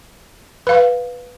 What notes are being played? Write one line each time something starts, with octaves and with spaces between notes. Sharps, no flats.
B4 F5